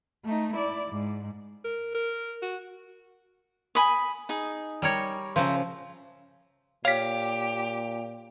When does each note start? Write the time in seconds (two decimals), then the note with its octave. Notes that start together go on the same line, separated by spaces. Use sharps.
0.25 A3 D#4
0.54 E4 D5
0.89 G#2
1.65 A#4
1.95 A#4
2.42 F#4
3.75 G#5 B5 D#6
4.29 D#4 G#4
4.82 G3 A#4 C#5
5.36 C#3 F3 C5 E5 A#5
6.85 A#2 G4 C#5 F5 B6